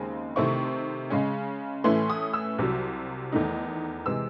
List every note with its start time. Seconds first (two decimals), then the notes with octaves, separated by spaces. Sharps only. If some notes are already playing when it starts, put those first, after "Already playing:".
Already playing: D#2 C#3 G#3 C4
0.36 C3 D#3 A3 C4 E4 C#6
1.10 C#3 G#3 C#4
1.84 A2 E3 A3 C#4 E4 C6
2.10 D#6
2.33 E6
2.58 C2 C3 F#3
3.32 E2 D#3 A3 D#4
4.06 C3 E3 G#3 E6